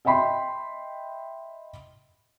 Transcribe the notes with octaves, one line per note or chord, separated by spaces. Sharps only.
D#5 E5 G5 B5 C6